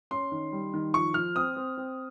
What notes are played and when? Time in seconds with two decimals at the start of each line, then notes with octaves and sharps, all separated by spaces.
0.11 C#4 C6
0.32 D#3
0.52 G3
0.73 D#3
0.94 F3 C#6
1.14 F3 F6
1.35 C4 D#6
1.56 C4
1.77 C4